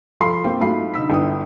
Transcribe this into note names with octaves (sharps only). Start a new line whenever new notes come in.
F3 A4 F5 B5 C6 C7
A#3 C4 F4 G4 G5
G#2 F#3 A3 F4 B5 C7
D3 D#4 E6 B6
G1 E4 G5 D#6